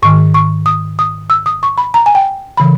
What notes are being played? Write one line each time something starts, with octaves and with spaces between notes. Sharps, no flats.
G#2 D#3 C#6
C#6
D#6
D#6
E6
D#6
C#6
B5
A#5
G#5
G5
C#3 E3 B5